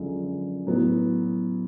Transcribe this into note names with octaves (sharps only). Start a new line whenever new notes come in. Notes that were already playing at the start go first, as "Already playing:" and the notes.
Already playing: F#2 D3 F3 G#3
A2 F#3 B3 E4